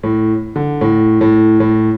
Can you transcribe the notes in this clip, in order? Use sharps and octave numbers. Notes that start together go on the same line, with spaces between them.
A2
D3
A2
A2
A2